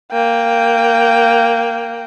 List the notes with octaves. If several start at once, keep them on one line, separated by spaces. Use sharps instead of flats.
A#3 G5